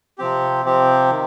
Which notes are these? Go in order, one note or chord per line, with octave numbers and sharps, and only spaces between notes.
C3 F3 C4 G4
C3 F3 C4 G4
D#3